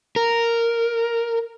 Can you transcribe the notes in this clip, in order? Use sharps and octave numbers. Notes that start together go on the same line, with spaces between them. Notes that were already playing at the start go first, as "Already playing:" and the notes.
A#4